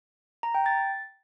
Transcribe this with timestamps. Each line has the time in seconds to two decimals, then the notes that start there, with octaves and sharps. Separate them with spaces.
0.43 A#5
0.55 G5
0.66 A6